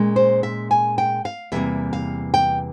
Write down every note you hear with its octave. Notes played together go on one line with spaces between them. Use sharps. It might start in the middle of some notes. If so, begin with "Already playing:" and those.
Already playing: A#2 G#3 C#4
C5
E5
G#5
G5
F5
E2 C3 G3 A#3 E5
F5
G5